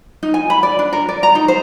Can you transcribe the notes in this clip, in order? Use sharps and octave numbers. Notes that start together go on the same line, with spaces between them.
D#4
G#5
B5
D5
D4
A#4
D5
A#5
D#4
C5